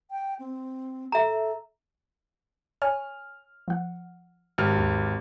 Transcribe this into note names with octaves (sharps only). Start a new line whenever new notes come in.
G5
C4
A4 E5 A#5
C#5 G#5 F6
F3 F#5
G#1 G4 F6
D#2